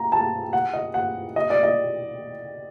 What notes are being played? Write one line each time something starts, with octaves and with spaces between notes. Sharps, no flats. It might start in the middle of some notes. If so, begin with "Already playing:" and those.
Already playing: A#5
A5
F#5
D#5
F#5
D#5
D5
D#5